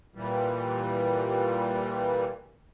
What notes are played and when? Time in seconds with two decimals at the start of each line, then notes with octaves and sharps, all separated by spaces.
0.15 A#2 E3 G3